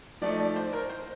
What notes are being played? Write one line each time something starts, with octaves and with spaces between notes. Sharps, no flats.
F3 A3 D#4 D5
D5
C5
A#4
C5